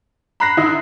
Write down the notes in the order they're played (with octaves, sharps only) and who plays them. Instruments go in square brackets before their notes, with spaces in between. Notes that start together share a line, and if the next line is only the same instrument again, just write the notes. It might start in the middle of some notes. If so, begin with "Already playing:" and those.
[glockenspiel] A#5 C7 [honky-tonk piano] B5 F#6 A#6
[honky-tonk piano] D3 D#4 E4